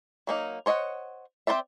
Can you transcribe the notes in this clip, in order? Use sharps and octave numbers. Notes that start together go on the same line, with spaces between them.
F#3 A#3 D#4
C5 C#5 D#5 E5 F#5
C4 E4 C5 D5 E5